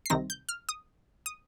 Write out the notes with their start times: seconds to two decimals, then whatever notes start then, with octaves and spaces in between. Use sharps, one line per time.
0.06 C7
0.10 C2 C3 D#3 C4 D#4 A#6
0.30 G6
0.49 F6
0.69 D#6
1.26 D#6